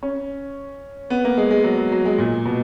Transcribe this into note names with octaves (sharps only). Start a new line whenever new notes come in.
C#4
B3
A#3
G#3
G#3
F#3
F#3
F#3
G#3
A#2
B2